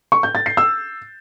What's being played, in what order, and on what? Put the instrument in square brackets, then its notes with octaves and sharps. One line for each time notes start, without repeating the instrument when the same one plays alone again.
[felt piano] C#6
G6
A6
C7
E6